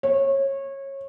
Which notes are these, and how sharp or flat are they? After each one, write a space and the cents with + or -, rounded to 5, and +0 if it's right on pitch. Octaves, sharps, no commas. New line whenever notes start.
C#5 -25